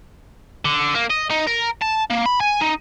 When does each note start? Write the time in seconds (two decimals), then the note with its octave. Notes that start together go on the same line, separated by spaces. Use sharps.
0.65 D3
0.94 A#3
1.10 D#5
1.30 D#4
1.47 A#4
1.81 A5
2.10 A#3
2.26 B5
2.40 G#5
2.61 D#4